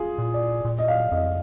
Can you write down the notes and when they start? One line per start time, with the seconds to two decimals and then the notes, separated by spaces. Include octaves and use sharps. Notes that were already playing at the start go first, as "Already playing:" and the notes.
Already playing: F4 G#4
0.18 A#2
0.34 D5
0.65 A#2
0.79 D#5
0.88 F5
1.11 F2 D#5